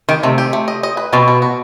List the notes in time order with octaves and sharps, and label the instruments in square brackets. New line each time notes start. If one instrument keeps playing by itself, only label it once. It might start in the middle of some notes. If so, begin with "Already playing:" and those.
[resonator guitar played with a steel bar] D#3 [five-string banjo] G4
[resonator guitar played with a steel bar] C3 [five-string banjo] A3
[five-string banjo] G4
A3
D#5
D#5
B4
[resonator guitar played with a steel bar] B2 [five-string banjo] C4
[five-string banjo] F#4
F#4